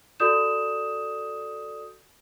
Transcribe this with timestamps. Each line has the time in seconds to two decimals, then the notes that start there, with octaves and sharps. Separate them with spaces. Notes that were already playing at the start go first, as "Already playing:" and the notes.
0.20 F#4 A4 D5 D#6 G6 E7